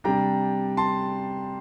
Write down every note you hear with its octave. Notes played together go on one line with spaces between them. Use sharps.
C3 G3 D4 G5 A#5
A5 C6